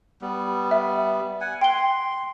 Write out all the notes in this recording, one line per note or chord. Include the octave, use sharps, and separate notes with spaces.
G3 B3
E5
F#5 G#5
G5 C6 G7